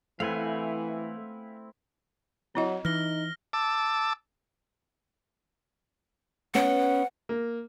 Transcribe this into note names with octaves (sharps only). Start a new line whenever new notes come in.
E3 A3 C4 E4 B4 F5 F#5 G#5
F#3 C4 E4 D#5
E3 D#4 F6 A#6 G7
A5 D6 E6
B3 C#4 F#5
A#3